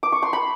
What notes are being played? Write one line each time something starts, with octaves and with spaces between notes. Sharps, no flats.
D6
C#6
C6
B5